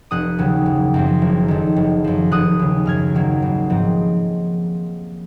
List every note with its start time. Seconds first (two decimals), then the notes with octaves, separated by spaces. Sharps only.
0.11 F1 D#6 F#6
0.38 D#2 C#3 F#3
0.66 F#1
0.94 F#2 F3 C4
1.22 F#1
1.48 F2 D#3
1.76 F#1
2.04 F#2 F3
2.31 F1 D#6 F#6
2.59 D#2 C#3
2.86 F#2 F6 G#6
3.14 D#3 F#3 A#3
3.42 G#1
3.70 G#2 F3 C4